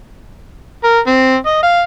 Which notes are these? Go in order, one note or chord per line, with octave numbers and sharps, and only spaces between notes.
A#4
C4
D#5
F5